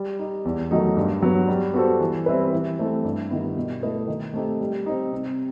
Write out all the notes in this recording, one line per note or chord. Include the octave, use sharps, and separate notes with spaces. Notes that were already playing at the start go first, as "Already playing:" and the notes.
Already playing: G3
D#4 G4
E2
D#3 F#3 A3 D#4
G2
F#3 B3
G3
B3 F#4 A4 C5
E3
G3 C4 E4 B4
E3
A3 C4 E4 G4
G2
D#3 G3 B3 E4
B2
A3 E4 B4 D#5
D#3
A3 C4 D#4 G4
G3
C4 D#4
C3